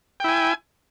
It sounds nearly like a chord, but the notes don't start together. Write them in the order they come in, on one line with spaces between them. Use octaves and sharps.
G5 E4 G#5